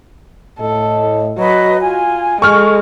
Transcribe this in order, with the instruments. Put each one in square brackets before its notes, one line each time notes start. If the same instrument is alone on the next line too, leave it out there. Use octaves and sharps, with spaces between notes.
[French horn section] A2 D#5 [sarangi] A4
[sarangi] F#3 [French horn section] F#4 [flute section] B4 D#5
[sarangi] F4 [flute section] G#5
[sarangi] G#3 [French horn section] A4 [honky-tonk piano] C#6 F6